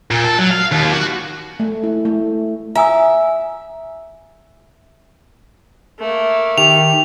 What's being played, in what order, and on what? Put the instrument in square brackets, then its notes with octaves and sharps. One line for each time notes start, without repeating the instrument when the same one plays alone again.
[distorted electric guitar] A#2
A4
F#3
F5
D#2
F#4
[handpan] A3
E4
A3
[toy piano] F4 G#5 D#6 [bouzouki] E5
[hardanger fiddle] A3 A#3
[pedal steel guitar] D#3 [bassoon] G4 [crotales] F7